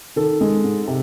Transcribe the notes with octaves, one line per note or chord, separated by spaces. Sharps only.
D#3 A4
G#3
G#2
C3